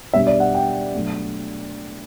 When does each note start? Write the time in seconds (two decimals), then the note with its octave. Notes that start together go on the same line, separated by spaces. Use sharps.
0.13 B2 G3 D4 E5
0.27 D5
0.40 F#5
0.54 G5
0.93 B2 F#3 A3 D4